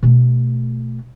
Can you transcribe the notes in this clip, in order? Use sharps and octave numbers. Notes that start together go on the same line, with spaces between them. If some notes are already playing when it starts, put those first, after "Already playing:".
B2 A3